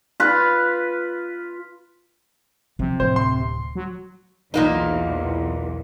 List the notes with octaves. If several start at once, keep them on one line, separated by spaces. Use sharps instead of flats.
F4 B4
C3 F3
D1 C5
C6
F#3
B1 E2 A#2 A#3 D#4